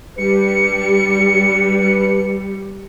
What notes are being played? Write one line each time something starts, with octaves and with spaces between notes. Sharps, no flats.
G3 D4 G4 B4 C#7